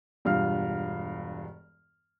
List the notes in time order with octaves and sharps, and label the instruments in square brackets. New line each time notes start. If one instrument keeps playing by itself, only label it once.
[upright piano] E1 G2 F4 F5 F6